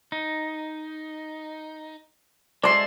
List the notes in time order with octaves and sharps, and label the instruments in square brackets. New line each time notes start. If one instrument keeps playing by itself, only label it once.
[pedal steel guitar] D#4
[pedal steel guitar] G#3 A4 [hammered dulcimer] D5 C6